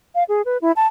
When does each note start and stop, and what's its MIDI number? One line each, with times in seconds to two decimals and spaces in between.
0.15 0.23 77
0.29 0.42 68
0.45 0.58 71
0.62 0.72 64
0.76 0.87 81